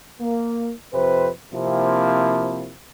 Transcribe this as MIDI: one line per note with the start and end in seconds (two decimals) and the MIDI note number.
0.21 0.72 58
0.93 1.30 41
0.93 1.30 48
0.93 1.30 71
0.93 1.30 72
1.53 2.73 48
1.53 2.73 53
1.53 2.73 58
1.53 2.73 60
1.53 2.73 64